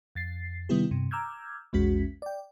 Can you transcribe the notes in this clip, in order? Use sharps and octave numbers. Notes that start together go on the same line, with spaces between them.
F2 A6 C7
C3 D#3 G3 B3 E4 G4
G2 C3
A#5 D6 E6 F6 G6 G#6
A#1 E2 G#3 C#4 F#4 B6
D5 G5